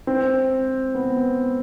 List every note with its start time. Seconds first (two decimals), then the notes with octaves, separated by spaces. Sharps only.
0.07 C4
0.95 B3